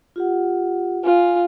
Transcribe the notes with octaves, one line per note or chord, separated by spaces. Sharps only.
F4 G4 F#5
F4 G#5